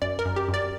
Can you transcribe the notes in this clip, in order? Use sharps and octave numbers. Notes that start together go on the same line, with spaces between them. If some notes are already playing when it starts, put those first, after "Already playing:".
F#2 D5
A#4
F#2
G4
F#2
D5